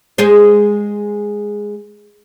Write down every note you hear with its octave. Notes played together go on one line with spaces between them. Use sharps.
G#3 G#4 C5